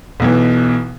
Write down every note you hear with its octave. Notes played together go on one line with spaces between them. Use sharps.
B1 B2 E3